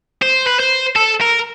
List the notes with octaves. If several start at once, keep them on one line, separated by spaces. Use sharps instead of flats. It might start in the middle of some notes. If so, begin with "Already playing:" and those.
C5
B4
C5
A4
A#4